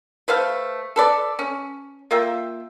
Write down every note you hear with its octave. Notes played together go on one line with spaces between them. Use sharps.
A3 B4 C5 F5
A4 B4 D5
C#4
A#3 F4 E5 G5